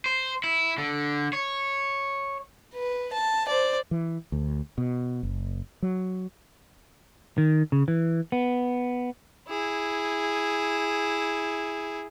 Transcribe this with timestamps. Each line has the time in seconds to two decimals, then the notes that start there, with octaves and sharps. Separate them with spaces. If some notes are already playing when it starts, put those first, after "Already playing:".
0.06 C5
0.44 E4
0.78 D3
1.33 C#5
2.75 B4
3.14 A5
3.48 C5 D5
3.91 E3
4.32 D2
4.78 B2
5.23 F#1
5.82 F#3
7.38 D#3
7.72 C#3
7.88 E3
8.32 B3
9.49 E4 G#4